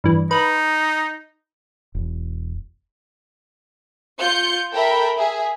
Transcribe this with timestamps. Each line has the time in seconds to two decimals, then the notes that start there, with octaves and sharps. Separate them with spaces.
0.04 G2 E3
0.31 D#4 B4
1.95 E1
4.20 F4 G6 C#7
4.73 A4 A#4 E5 G5 B5
5.17 G#4 E5